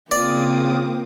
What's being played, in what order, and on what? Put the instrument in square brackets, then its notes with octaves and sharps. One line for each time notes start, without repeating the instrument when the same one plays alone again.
[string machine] C#3 D6 D#6 [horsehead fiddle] A#3 C4 [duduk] F4 [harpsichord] D5